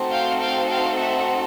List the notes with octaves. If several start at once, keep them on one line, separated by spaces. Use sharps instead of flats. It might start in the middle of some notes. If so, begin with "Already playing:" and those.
Already playing: A3 C4 D#4 F#4 A4
F5 G5
F5 G5
F5 G5
E5 F#5